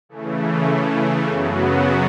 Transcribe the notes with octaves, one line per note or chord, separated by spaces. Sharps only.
C#3 E3 A3
F#2 C#3 F#3 B3 F#4